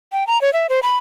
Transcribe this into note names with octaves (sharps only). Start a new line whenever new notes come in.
G5
A#5
C#5
E5
C5
B5